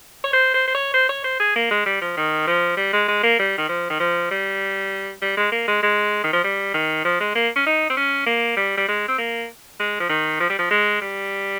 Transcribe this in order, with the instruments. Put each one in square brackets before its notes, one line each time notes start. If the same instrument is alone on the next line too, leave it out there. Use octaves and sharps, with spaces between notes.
[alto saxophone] C#5
C5
C5
C5
C#5
C5
C#5
C5
G#4
A#3
G#3
G3
F3
D#3
F3
G3
G#3
G#3
A#3
G3
D#3
F3
D#3
F3
G3
G3
G#3
A#3
G#3
G#3
D#3
F3
G3
D#3
F3
G#3
A#3
C#4
D#4
C4
C#4
A#3
G3
G3
G#3
C4
A#3
G#3
F3
D#3
F3
G3
F3
G#3
G3